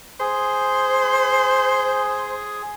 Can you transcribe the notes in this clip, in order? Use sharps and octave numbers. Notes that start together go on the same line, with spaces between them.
G#4 C5